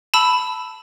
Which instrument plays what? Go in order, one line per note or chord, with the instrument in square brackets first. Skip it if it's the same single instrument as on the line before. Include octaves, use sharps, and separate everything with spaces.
[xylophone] A5 B5 E6